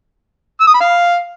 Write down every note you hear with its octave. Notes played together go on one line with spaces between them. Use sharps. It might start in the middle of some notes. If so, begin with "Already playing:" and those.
E6
D#6
B5
F5